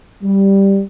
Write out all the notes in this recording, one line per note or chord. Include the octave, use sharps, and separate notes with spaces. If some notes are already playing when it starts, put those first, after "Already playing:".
G3